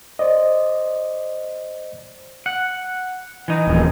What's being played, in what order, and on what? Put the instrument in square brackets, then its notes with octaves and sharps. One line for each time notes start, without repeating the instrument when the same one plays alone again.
[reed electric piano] C5 D5 D#5
[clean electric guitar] F#5
E3 D#4
[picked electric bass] D#1 A#1